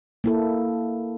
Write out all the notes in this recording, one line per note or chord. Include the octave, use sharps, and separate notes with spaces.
A#3 E4 A4